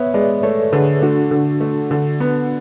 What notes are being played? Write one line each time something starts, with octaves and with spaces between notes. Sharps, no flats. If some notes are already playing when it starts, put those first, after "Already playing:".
Already playing: B3 C#5 E5
G#3 B4 D5
A3 A4 C#5
D3 G#4 B4
A3 D4 F#4
D3
A3
D3
B3